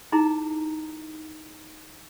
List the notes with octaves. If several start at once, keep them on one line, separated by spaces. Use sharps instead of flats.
D#4 E4 G#4 A#5